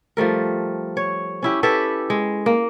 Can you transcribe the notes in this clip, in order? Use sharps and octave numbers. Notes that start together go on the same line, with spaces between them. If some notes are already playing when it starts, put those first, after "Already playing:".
F3 G3 A3 A#4
C#5
C#4 E4 G4
E4 G4 A4 B4
G#3
A#3